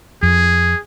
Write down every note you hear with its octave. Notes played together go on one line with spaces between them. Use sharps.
F2 G#4